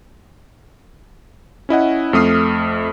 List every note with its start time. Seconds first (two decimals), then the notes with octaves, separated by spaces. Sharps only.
1.69 C#4 E4 D#5 F#5
2.13 F2 A3 D#6 F6 C7